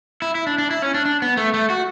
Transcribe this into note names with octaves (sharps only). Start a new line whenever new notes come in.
E4
E4
D4
D4
E4
C#4
D4
D4
B3
A3
A3
F#4